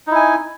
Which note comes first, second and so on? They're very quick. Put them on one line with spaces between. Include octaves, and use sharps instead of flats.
D#4 E4 G#5